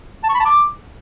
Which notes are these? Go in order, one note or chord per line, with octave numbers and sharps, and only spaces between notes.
A5
C#6
B5
A5
D6